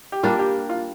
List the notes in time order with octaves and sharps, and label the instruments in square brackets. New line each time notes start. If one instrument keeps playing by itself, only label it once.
[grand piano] G4
[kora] G3 A#3 D4 [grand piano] F4
[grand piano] G4
F4